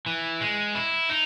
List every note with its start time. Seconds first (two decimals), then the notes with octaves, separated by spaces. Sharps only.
0.06 E3
0.41 G#3
0.75 E4
1.10 D#4